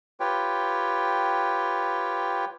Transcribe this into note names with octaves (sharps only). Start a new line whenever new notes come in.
F4 G4 B4 C#5 G5